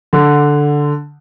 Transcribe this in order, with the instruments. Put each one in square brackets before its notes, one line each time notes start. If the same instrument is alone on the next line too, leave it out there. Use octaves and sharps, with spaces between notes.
[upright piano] D3